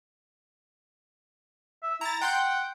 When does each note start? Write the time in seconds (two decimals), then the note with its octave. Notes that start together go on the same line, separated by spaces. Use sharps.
1.83 E5
2.01 E4 A#5 A6
2.21 F#5 G5 C6 G6